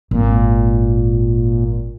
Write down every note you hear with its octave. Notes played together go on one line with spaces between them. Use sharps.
G#1 A#2